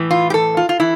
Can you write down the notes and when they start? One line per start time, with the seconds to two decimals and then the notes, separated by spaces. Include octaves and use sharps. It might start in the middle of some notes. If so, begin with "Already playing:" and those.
Already playing: A2 E3
0.11 F4
0.30 G4
0.34 A4
0.57 F4
0.69 F4
0.80 E3 E4